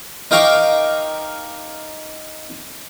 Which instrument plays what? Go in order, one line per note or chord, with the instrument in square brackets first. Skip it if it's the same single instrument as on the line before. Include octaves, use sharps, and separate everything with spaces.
[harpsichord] D#4 A#4 F5 G5 C#6 D6